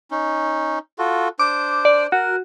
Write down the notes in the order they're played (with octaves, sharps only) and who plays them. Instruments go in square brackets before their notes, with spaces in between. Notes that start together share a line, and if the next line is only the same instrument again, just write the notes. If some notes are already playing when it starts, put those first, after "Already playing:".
[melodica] C#4 D#4
F4 F#4 A4
[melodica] D4 C5 [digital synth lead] D6
[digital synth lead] D5
[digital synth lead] F#4 [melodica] A#4